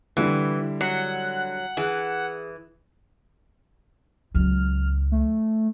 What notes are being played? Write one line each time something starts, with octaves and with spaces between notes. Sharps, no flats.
D3 E3 G3 E4
F#3 F#5
E3 G#4
C#2 F#3 F6
A3